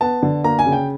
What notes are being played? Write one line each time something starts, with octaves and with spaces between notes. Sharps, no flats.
B3 A5
D3
A#3 A#5
G#5
C#3
G5